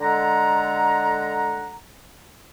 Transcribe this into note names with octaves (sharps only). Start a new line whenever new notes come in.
D3 G#3 A4 F#5 A#5